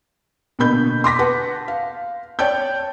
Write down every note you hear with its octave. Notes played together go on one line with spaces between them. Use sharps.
B2 D3 A#3 B5 G6
C6 D6 A#6 B6
B4 F#5 A5
F5
C#5 D5 G5 A5 G6